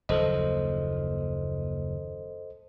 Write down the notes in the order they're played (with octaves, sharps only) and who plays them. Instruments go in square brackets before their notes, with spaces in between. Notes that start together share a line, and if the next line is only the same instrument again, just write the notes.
[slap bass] F#1 D#2 F3 [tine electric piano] A4 C5 D#5